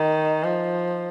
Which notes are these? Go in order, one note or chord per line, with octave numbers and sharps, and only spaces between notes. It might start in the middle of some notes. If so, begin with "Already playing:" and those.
Already playing: D#3
F3